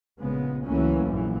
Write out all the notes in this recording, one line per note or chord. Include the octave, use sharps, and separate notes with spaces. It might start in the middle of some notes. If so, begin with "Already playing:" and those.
A#1 C#3 G#3 B3
C#2 E3 F#3 A3 A#3 C#4
A#1 F#2 E3